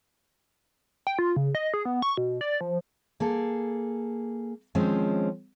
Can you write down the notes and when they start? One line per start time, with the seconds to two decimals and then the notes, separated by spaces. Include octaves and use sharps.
1.07 G5
1.19 F4
1.36 C#3
1.55 D#5
1.74 G#4
1.85 B3
2.02 C#6
2.17 B2
2.41 D5
2.61 F3
3.20 A#3 G#4 A4
4.75 D#3 F3 G#3 C4 C#4